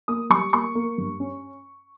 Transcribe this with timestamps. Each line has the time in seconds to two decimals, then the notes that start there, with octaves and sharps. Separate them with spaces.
0.08 A#3 D#6
0.30 G3 C#6
0.53 A#3 C#6
0.75 A#3
0.98 G2
1.20 C#4